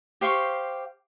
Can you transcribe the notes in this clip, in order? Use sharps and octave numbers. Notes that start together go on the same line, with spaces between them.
G4 C5 F5 C#6